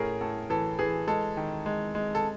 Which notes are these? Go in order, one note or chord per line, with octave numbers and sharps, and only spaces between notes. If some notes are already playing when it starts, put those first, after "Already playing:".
Already playing: A2 C#4 G#4 A#4
A2 A4
E3 A4
E3 G#4
G#3 A4
D#3
G#3
G#3
A4